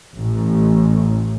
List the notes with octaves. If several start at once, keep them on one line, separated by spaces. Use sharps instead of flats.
A1